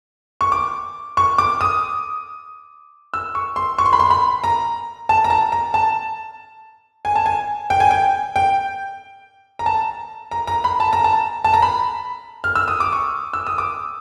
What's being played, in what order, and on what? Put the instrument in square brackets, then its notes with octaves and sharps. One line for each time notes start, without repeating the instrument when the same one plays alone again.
[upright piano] C#6
D6
C#6
D6
D#6
E6
C#6
C6
C#6
C6
B5
C6
B5
A#5
A5
A#5
A5
A#5
A5
G#5
A5
G#5
G5
G#5
G5
G5
A#5
A5
A#5
A#5
B5
A5
A#5
A5
A5
A#5
B5
F6
E6
D#6
D6
C#6
E6
D#6
D6